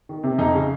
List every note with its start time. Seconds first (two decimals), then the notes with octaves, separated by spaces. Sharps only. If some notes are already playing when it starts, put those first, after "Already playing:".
0.09 D#3
0.23 C3
0.38 F2 D#4
0.54 C#3